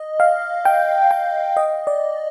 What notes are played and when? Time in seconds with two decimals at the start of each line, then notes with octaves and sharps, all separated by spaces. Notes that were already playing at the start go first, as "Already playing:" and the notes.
Already playing: D#5
0.20 F5
0.65 G5
1.11 G5
1.57 D#5
1.87 D5